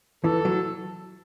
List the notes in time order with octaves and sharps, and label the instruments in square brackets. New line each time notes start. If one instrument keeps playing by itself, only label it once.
[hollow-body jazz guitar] E3 [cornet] A4
[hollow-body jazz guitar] F#3